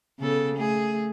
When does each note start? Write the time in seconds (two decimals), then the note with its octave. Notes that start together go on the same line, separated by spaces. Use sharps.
0.19 C#3 B3 A4
0.55 A3 G#4